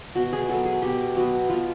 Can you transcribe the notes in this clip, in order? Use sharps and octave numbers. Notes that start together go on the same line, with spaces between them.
B2 F#4
G#4
F#3 B3 A4
G#4
B2 G4
F#3 B3 F#4
B2 F4